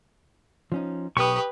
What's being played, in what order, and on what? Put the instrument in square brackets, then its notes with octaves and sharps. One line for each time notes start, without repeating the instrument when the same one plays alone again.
[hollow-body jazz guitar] F3 C#4 D#4
[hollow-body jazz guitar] B1 [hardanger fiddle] G4 B4 [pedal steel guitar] C#6 D#6